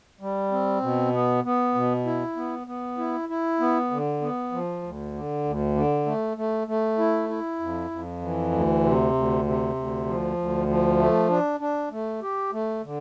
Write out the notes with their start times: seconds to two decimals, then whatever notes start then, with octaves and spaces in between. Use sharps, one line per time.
0.21 G3
0.52 C4
0.82 B2
1.13 B3
1.44 B3
1.75 B2
2.06 E4
2.36 B3
2.67 B3
2.98 E4
3.29 E4
3.60 B3
3.91 D3
4.21 B3
4.52 F3
4.82 D2
5.14 D3
5.44 D2
5.75 D3
6.06 A3
6.37 A3
6.68 A3
6.98 E4
7.29 E4
7.60 F2
7.91 F2
8.22 E3
8.52 D2
8.84 C3
9.14 D2
9.45 C3
9.75 D2
10.06 F3
10.37 D2
10.68 F3
10.99 A3
11.29 D4
11.60 D4
11.91 A3
12.22 G4
12.53 A3
12.84 D3